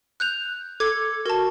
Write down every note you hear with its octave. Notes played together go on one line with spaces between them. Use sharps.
F#6 G6 F7
A4 D6 G#6
F#4 A#4 A5